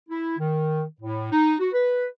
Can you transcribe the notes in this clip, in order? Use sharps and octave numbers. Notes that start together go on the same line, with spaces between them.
E4
D#3
A2
D#4
F#4
B4